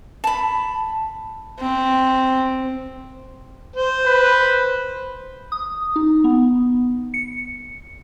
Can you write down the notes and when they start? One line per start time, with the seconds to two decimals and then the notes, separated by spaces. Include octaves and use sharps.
0.24 A5 B5
1.60 C4
3.76 C5
4.06 B4
5.52 D#6
5.96 D#4
6.24 B3
7.14 C#7